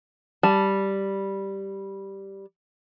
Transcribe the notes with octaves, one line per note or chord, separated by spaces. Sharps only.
G3 A5